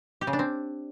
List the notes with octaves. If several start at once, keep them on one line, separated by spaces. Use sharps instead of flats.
G4
C#3
D4
C4